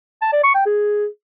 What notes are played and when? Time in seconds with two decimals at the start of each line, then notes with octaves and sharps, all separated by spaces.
0.22 A5
0.33 D5
0.44 C#6
0.55 G5
0.66 G#4